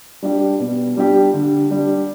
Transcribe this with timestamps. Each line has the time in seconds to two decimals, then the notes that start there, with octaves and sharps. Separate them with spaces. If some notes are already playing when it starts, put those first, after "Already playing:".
0.23 G3 D4 G4
0.60 B2
0.97 G3 D4 G4
1.34 D3
1.71 G3 D4